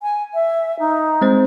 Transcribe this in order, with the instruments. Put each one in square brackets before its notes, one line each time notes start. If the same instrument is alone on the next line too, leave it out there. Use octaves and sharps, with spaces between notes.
[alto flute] G#5
E5
D#4
[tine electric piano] G#3 C4 C5